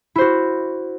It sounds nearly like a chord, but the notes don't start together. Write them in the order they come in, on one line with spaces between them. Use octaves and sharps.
E4 C5 F#4